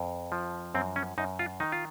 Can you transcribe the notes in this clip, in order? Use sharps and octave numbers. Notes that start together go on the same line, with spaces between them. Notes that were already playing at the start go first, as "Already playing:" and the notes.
Already playing: F2
F3
F#2 C4
C#4
F#2 D#4
F4
D#3 D#4
F4